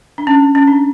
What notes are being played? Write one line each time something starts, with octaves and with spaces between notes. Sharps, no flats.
D4
C#4
C#4
D4